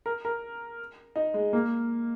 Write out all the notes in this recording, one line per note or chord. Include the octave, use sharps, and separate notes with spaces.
A#4
A#4
D#4
G#3
A#3